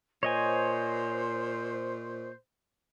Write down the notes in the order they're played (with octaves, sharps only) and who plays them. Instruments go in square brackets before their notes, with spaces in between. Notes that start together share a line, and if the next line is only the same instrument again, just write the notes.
[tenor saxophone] A#2 [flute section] C5 [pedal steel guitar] C#5 D#5 G#5